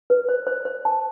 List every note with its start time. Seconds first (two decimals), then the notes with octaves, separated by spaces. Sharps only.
0.10 B4
0.29 C5
0.47 C5
0.65 C5
0.85 A5